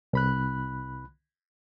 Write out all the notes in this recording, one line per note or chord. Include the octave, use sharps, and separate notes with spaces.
C2 B5 F#6